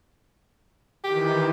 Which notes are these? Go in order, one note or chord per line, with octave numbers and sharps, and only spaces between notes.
D#3 E3 G4